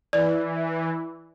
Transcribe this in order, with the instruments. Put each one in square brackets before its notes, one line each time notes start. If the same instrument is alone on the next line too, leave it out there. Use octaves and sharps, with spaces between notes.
[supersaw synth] E3 [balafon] D5